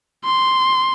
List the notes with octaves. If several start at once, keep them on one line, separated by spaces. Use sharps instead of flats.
C6